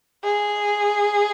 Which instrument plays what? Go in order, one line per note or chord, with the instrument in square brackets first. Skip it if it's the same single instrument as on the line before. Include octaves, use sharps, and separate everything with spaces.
[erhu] G#4